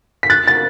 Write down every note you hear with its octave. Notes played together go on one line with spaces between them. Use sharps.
B6
F#6 A6
A6